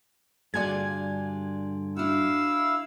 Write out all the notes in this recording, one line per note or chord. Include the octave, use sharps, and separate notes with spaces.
G2 D3 F4 F#4 G#4 D5 G#5 G#6
D4 E4 F#4 F5 E6